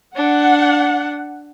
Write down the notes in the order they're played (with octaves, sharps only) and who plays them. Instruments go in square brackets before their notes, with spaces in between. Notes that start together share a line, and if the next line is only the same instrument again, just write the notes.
[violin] D4 [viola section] F#5